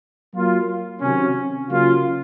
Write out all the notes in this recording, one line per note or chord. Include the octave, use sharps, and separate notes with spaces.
F#3 A#3 F4
C3 D#3 F#3 C#4
C#3 F#3 A#3 F4